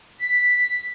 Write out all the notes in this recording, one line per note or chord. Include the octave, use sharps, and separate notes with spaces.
B6